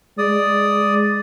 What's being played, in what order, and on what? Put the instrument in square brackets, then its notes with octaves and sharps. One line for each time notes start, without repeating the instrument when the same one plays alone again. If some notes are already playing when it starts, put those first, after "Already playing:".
[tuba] G#3 [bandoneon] D5 D#6